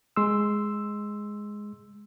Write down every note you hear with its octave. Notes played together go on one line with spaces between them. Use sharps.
G#3 C6 E6